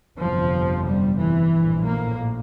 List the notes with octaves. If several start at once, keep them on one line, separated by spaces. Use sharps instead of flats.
G1 F2 C3 F3
G3
E3
A#1 A2
A#3